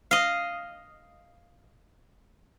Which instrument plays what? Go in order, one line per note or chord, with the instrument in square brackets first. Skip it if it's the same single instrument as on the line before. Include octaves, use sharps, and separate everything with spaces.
[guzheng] D#5 F5